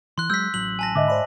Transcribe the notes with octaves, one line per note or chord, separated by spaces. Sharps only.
E3 C6 F#6
F#3 G#3 E6 G6 B6
A1 F#3 F#7
G#5 A5 A#6
G#2 D3 D#5 E5 D6
C5 D5 B5